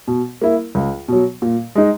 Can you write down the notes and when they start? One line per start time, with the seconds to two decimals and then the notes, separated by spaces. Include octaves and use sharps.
0.07 B2
0.41 A#3 E4
0.75 C#2
1.08 B2 F#3
1.42 A#2
1.75 G#3 D#4